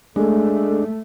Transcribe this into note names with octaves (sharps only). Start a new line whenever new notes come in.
G#3 A3 D4 A4